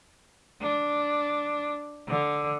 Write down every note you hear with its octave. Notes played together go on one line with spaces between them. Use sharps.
D4
D3